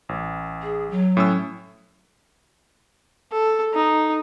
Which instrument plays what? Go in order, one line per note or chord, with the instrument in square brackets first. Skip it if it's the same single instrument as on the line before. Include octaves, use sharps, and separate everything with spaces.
[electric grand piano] A1
[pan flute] G#4
F#3
[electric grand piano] A2 C#4 E6
[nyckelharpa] A4
D#4